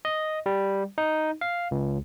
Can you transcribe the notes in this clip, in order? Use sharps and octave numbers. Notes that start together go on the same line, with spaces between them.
D#5
G3
D#4
F5
C#2